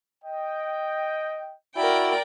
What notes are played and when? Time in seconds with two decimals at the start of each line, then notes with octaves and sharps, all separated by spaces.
0.23 D#5 G5
1.76 E4 F#4 A#4 D5 G5